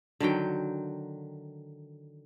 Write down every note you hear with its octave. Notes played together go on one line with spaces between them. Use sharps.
D3 D#3 F#3 G5